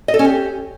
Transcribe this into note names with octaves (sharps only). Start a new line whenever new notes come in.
D#5
A4
C#4
G4